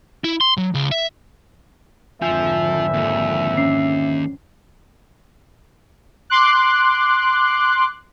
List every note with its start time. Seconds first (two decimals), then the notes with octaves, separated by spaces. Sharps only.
0.24 E4
0.41 C6
0.57 F#3
0.75 C#2
0.91 E5
2.22 G#1 F2 D3 F3 E5 G#5 G6
2.94 D#2
3.57 C#4 C7
6.30 C6 D6 F#6